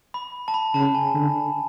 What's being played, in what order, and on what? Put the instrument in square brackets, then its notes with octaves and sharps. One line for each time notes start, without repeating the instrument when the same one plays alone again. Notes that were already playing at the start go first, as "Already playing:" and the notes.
[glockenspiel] B5
A5
B5
[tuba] C#3 [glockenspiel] A5
[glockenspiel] G#5
[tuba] D3